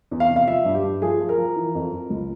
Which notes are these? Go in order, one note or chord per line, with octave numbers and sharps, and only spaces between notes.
E2
F5
C3
F5
F3 E5
G2
G4
G2
F3 G#4
F3
A#4
F3
E3
F2
F2
C#2